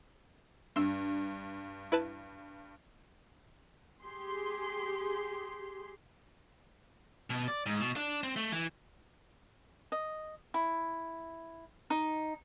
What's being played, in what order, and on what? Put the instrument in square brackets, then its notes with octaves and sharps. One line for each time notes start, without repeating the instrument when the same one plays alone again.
[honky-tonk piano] G2 [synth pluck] C6 E6
[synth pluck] E4 B4 A5
[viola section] G4 G#4 C6
[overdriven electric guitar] B2
D5
G#2
B2
D4
C4
A3
E3
[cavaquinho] D#5
E4
D#4